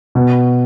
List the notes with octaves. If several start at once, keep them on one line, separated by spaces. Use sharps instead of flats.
B2